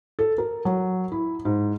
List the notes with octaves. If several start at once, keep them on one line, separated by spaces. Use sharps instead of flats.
A4
A#4
F#3
E4
G#2